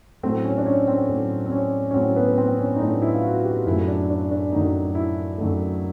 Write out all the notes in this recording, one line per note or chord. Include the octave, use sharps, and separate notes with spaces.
A2 F#3 A3 C4
C#4
D4
C#4
C4
A2 F#3 A3
C4
C#4
C#4
A2 F#3 A3 C4
B3
C4
C#4
D#4
A2 F#3 A3 D4
E4
F4
F#4
G4
F#2 D#3 F#3 A3 E4
D4
D4
D4
F#2 D#3 F#3 A3 D#4
E4
F#2 D#3 F#3 A3